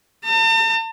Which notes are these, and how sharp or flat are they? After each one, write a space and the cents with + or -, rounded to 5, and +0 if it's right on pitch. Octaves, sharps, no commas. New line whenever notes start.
A5 +45